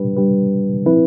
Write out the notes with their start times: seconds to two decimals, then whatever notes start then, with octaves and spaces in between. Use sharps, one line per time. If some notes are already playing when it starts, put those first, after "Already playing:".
Already playing: G3 D4 G4 B4
0.16 G3 D4 G4 B4
0.86 F3 C4 E4 B4